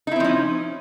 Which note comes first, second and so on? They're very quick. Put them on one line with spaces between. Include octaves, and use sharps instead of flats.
D#4 E4 C4 F3 C#4